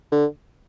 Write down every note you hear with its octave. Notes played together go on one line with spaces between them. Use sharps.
D3